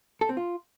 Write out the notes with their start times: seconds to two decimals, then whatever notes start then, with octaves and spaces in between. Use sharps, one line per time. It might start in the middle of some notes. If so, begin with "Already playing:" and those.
0.21 A4
0.29 C4
0.37 F4